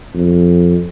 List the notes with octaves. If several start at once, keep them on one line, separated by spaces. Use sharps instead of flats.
F2